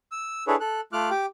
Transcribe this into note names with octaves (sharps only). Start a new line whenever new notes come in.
E6
D4 E4 G#4 A4 B4 C#5
A4 F#6
A3 F4 D6 F6 F#6
G4 G5 D6